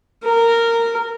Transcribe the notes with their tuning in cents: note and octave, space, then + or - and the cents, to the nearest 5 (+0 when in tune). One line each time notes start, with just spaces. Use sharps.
A#4 -15